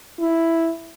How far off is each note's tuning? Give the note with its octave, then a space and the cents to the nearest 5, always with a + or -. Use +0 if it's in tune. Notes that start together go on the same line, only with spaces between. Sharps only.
E4 +0